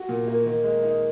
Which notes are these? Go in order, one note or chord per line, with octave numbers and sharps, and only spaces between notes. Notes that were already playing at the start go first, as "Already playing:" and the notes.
Already playing: F#4
A#2
A#3
D#3
G#3
D#4